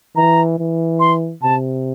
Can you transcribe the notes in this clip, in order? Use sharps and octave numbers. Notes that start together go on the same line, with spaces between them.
E3 A#5
E3
C6
C3 A5